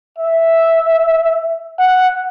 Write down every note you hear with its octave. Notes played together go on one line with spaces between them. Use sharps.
E5
F#5